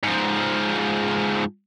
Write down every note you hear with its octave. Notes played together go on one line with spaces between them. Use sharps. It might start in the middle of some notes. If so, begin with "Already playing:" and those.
G#2 F3